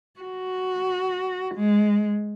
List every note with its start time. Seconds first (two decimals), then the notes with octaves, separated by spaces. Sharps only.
0.20 F#4
1.55 G#3